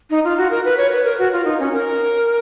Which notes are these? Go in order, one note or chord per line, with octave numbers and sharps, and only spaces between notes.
D#4
F4
F#4
A#4
B4
C#5
B4
A#4
F#4
F4
D#4
C#4
A#4